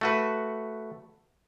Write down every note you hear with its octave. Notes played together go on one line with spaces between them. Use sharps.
A3 F#4 B4